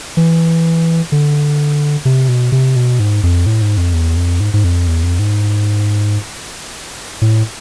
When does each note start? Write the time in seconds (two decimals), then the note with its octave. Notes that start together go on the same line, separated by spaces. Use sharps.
0.17 E3
1.12 D3
2.05 C3
2.29 B2
2.52 C3
2.76 B2
3.00 G#2
3.23 F2
3.46 A2
3.62 G#2
3.78 F2
3.93 E2
4.16 F2
4.40 G#2
4.54 G#2
4.64 F2
4.87 E2
5.03 F2
5.19 G#2
7.22 A2